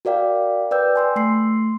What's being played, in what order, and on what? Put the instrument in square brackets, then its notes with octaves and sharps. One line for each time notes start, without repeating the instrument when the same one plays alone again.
[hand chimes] F#4 A#4 D5 F5 G5
B4 D5 G5 E6 G6
G#5 C6 E6
A3 C6 C7